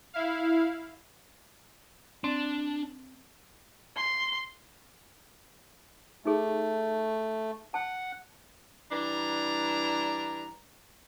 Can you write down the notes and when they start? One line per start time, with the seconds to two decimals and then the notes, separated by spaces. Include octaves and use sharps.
0.14 E4 F5
2.24 C4 D4
3.97 C6
6.25 A3 D#4 G#4
7.74 F#5 A5
8.92 E3 G3 D4 A#5